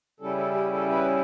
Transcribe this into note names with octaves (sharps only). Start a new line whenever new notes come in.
C#3 G3 C#4 E4 A4
A4
G4
A4
B4